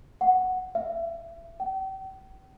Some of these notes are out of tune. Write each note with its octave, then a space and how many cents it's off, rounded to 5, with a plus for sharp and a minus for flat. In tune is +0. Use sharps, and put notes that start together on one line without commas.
F#5 +0
E5 +30
G5 -40